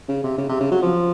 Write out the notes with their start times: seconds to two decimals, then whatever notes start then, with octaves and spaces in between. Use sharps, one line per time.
0.08 C#3
0.24 C3
0.38 C#3
0.49 C3
0.60 C#3
0.71 F#3
0.82 F3